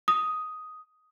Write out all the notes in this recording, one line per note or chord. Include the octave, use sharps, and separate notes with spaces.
D#6